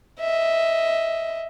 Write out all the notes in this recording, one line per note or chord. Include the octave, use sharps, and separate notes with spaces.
D#5 E5